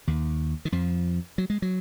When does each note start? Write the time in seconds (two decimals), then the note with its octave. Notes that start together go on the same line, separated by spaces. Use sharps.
0.07 D#2 D#3
0.65 D#3
0.72 F2 F3
1.38 F#3
1.50 G#3
1.62 F#3